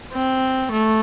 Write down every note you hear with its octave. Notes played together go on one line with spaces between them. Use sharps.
C4
A3